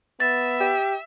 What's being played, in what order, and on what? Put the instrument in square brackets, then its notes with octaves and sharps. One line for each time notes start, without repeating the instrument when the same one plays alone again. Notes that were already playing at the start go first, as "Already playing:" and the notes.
[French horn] B3 [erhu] E5 [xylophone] A6
[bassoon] G4